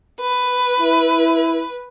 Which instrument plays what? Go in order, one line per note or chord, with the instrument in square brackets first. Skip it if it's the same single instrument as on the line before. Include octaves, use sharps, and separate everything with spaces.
[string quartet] B4
[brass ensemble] E4